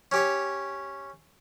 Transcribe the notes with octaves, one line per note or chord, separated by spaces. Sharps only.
C#4 G4 C#5